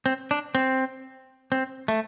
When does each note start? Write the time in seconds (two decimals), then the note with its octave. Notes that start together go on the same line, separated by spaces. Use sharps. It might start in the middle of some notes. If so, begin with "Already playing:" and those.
0.06 C4
0.31 D4
0.55 C4
1.52 C4
1.88 A3